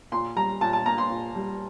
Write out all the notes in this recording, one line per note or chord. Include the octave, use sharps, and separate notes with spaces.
A#2 C6
G3 A#5
A#2 A5
A5
A#3 A#5
C6
A#2
G3